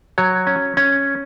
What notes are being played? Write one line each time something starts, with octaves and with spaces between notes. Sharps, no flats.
F#3 C#5
C#4
C#4